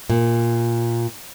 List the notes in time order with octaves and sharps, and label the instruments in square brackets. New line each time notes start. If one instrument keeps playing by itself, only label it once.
[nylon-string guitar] A#2